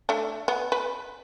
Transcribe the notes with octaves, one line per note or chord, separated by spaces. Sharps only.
A3 D4
B3
B4